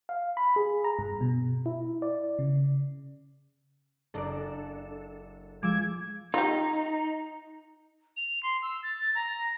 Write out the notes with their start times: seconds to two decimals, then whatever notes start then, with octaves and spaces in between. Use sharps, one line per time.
0.09 F5
0.37 B5
0.56 G#4
0.84 A#5
0.99 G2
1.21 B2
1.66 E4
2.02 D5
2.39 C#3
4.14 F#1 D4 A4 A#4 D5
5.63 F3 G#3 D6 E6 G#6
6.34 D#4 F4 G4
8.17 F7
8.43 C6
8.62 E6
8.83 A6
9.15 A#5